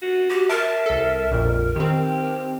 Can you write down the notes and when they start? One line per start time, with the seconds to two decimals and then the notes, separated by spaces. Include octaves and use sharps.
0.02 F#4
0.30 F#4 G4
0.49 A#4 E5 A5
0.86 C2 A4
1.32 A#1 F2 A#2
1.76 D#3 C4 G4